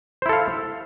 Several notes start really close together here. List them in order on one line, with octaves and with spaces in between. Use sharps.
C5 E4 A4 F5